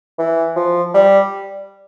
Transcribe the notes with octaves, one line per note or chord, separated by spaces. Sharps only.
E3
F3
G3